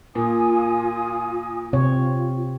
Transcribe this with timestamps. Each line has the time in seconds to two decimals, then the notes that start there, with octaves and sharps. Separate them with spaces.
0.15 A#2 F4 G#5 D#6
1.73 C3 C4 F4 C#5